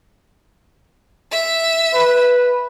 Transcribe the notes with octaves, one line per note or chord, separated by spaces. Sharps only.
E5 E6
B4